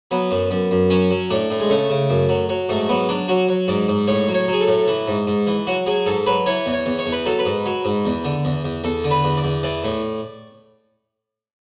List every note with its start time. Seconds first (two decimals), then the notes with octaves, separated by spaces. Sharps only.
0.11 F#3 B3
0.31 F#2
0.51 F#2
0.71 F#2
0.90 F#3 C#4
1.10 F#3
1.30 A2 D4
1.50 A2
1.60 G#3
1.70 C#3 A3
1.90 C#3
2.10 F#2
2.29 F#3
2.49 F#3
2.69 G#2 A3
2.89 F#3 B3
3.09 F#3 D4
3.28 F#3 F#4
3.48 F#3
3.68 G#2 D5
3.88 G#2
4.08 A2 C#5
4.28 F#3
4.34 C#5
4.48 F#3
4.53 G#4
4.61 A4
4.68 A2
4.88 E3
5.08 G#2
5.27 G#2
5.47 E3
5.67 F#3 F#4
5.86 F#3 G#4
6.06 G#2 A4
6.26 F#3 B4
6.46 E3 C#5
6.66 E2
6.73 C#5
6.86 E2
6.99 C#5
7.06 E2
7.12 B4
7.25 F#3 A4
7.39 B4
7.45 G#2
7.66 F#3
7.85 G#2
8.05 E2
8.25 D3
8.45 E2
8.64 E2
8.84 E2 A4
9.04 D3
9.11 B4
9.24 E2
9.37 D5
9.44 E2
9.63 E3 D5
9.84 A2